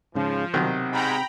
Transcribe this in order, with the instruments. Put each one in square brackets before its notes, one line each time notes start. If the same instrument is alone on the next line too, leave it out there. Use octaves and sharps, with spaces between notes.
[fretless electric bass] G#2 C#3 [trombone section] F3
[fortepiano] B1 D#3 [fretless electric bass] C3
[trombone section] G#2 [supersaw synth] G5 A#5 B5